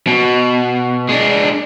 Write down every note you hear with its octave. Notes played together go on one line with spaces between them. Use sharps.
B2
G#3 D4